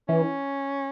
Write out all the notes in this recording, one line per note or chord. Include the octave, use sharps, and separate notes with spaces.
E3 C#4